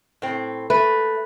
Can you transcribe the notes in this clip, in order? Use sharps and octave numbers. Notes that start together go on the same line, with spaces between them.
A2 C4
A3 B4